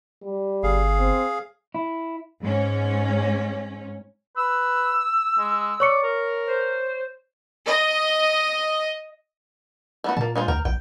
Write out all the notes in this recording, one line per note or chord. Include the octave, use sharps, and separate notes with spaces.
G3
G1 G#4 F5
C4
E4
G#2 C#4
B4 E6
G#3
C#5 D5 C#6 C#7
A#4
C5
D#5
A3 B3 F#4
A#2 A#3 A5
G#3 F4 C5
D2 A#4 G5
A#1 G5